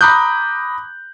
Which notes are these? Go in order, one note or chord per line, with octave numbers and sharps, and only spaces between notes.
A#5 B5 D6 D#6 F#6 G6